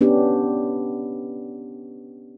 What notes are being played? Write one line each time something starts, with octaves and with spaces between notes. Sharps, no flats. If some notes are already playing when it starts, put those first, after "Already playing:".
B3 C#4 D4 G4